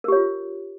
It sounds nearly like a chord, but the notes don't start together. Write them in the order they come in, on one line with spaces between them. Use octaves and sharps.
A#4 G4 C#5 F4